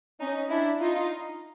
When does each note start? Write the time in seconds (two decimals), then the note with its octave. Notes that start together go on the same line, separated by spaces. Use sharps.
0.20 C#4 D#4
0.50 D4 E4
0.81 D#4 F4